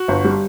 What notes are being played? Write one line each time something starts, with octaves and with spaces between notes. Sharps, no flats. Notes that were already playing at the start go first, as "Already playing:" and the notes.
Already playing: F#4
G1
G3